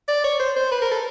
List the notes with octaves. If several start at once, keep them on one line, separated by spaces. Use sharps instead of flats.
D5
C#5
C5
C5
B4
A#4
A4